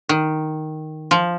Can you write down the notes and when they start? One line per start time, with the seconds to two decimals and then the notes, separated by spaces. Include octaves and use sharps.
0.09 D#3
1.11 F3